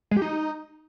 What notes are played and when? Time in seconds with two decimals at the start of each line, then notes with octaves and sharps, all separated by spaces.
0.11 G#3
0.17 G4
0.22 D#4